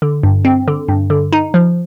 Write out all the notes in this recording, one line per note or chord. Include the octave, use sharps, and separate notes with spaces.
D3
G2
C4
D3
G2
D3
D#4
F3